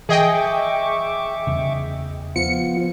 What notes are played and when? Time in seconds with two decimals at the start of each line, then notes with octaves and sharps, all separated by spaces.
0.09 E3 G#4 D#5 E5 G5 C#6 D6
1.47 E2 C#3
2.36 F3 B3 F4 C#7